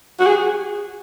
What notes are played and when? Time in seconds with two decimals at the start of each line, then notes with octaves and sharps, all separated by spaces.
0.20 F#4
0.27 G#4